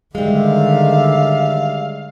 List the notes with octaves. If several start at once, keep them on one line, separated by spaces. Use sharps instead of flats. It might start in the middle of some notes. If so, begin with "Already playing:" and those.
D3 D#3 G3 G#3 G4 D5 E5 F5